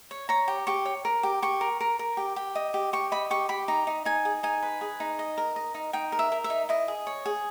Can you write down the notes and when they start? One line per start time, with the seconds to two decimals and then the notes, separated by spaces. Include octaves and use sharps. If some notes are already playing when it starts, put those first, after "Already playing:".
0.11 C#5
0.29 C#5 A#5
0.48 G4
0.67 G4 C#6
0.86 C#5
1.05 A#4
1.23 G4
1.42 G4 C#6
1.61 A#4
1.80 A#4
1.99 A#4
2.17 G4
2.36 G4
2.55 D#5
2.74 G4
2.93 G4 C#6
3.12 D#5 B5
3.30 G4 C#6
3.49 G4 B5
3.68 D#4 A#5
3.87 D#4
4.05 D#4 G#5
4.25 G#4
4.43 D#4 G#5
4.63 B4
4.81 G#4
5.00 D#4
5.19 D#5
5.38 A#4
5.56 D#5
5.75 D#4
5.93 D#4 G5
6.12 A#4
6.19 E5
6.32 A#4
6.44 E5
6.50 D#4
6.69 E4 D#5
6.88 G#4
7.07 C#5
7.26 G#4